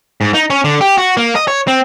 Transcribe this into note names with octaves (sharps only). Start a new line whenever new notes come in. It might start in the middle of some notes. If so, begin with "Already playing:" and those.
G#2
D#4
C#4
D3
G4
F#4
A#3
D#5
C#5
C4